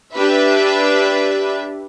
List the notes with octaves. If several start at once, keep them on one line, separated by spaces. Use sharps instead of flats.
D4 G4 B4 E5